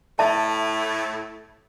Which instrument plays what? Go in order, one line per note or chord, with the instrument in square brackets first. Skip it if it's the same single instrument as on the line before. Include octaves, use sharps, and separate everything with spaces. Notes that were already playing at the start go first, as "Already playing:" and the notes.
[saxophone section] A2 A3 [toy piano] E5 A5